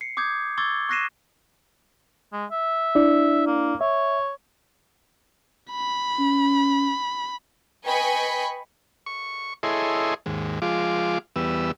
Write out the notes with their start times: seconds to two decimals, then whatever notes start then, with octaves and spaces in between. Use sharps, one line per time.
0.01 C7 C#7
0.17 D6 D#6 G6 G#6
0.58 C#6 D6 E6 G#6 A6 G7
0.89 C#6 F#6 A#6 C7 D#7 E7
2.33 G#3
2.51 E5
2.95 D4 E4 D5
3.47 A#3
3.81 C#5 E5
5.72 B5
6.20 C#4
7.85 B4 D#5 G5 G#5 B5 C#6
9.06 C#6
9.63 E4 G#4 A4 C#5 D#5 C6
10.26 D#2 G#2
10.62 F3 G#3 F4 D6
11.36 E2 G3 B3 E6